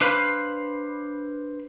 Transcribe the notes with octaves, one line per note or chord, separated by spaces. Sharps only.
D4 B4 C5 F5 B5